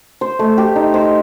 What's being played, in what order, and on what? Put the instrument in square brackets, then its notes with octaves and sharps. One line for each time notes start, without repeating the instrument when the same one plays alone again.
[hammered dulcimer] C5
A3
G4
D#4
C5